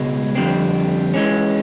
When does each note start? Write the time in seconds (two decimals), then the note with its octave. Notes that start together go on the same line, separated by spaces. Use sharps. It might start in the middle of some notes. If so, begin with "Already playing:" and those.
Already playing: C#2 B2 G#3
0.35 F2 D3 G3 C4
1.14 E3 G#3 C#4